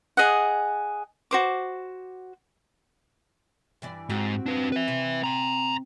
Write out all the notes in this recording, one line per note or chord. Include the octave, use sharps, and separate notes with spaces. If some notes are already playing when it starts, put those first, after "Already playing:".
G#4 D#5 F#5
F#4 C5 D6
G2 E3 D5
G#2 C4 F#4 G4
D4 B4
B4 E5
C3
A#5 C6